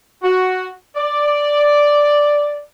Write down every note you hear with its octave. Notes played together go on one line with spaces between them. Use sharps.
F#4
D5